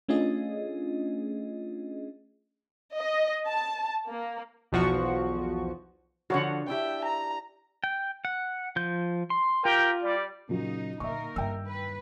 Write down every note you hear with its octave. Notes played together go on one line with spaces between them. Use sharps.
A3 C#4 D4 F4 G#4 D#5
D#5
A5
A#3
B1 E2 F3 F#4 C#6
D3 F3 F#4 C#5 F#5
D4 E4 G4 E5 G5
A#5
G5
F#5
F3 G6
C6
F4 G4 A#4 G5
G3 D5
A#2 C#3 F#3 D#4
A#2 D3 A#3 D#4 A#4 E5 C#6
G2 D#3 E5 G5 E6
B4